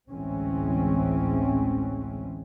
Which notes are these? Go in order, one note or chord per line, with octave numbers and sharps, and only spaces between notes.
A1 D2 E3 G#3 C4 C#4